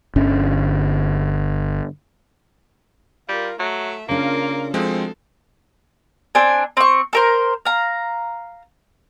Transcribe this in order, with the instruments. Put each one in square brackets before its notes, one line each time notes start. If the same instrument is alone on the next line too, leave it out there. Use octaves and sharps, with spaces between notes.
[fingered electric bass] G1 D3 C#4
[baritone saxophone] G3 [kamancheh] F4 A#4
[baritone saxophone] F#3 [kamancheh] A3 E5
[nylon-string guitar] C#3 D4 [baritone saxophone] A#3 [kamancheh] F4 A#4
[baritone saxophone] D2 [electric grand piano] F3 G#3 C4 [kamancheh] A4
[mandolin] C4 D4 G#5
C4 C#6
A4 A#4 C5
F5 A#5